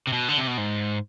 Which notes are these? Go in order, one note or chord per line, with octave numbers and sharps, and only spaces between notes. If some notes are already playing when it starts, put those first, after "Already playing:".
C3
B2
D3
C3
B2
G#2